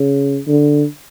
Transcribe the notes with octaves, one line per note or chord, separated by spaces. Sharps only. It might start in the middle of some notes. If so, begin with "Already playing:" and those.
Already playing: C#3
D3